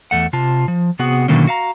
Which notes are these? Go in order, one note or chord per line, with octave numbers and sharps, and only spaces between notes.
E2 G#2 A3 F#5
C3 F4 A5
F3
C3 B3 F#4 G#4 F#5
B2 D3 D#3 F#3 A#3 C#4
F#4 F5 A#5